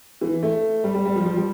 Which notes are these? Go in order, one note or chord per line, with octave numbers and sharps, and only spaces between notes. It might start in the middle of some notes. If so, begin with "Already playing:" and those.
E3
A3
G3
G3
G3
F3
F3
G3